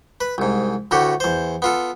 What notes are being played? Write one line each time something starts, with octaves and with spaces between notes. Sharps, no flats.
B4
C2 G#2
D2 A2 F#4 G4
E2 C5
B3 F4 A4